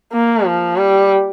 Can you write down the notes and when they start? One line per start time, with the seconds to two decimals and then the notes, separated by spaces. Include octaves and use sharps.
0.13 A#3
0.46 F3
0.77 G3